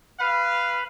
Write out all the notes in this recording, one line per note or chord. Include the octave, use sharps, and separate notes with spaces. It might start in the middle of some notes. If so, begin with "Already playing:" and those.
B4 F5 B5